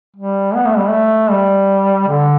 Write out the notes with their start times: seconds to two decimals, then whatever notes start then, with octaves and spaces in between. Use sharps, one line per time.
0.16 G3
0.55 B3
0.66 A3
0.78 G3
0.89 A3
1.31 G3
2.08 D3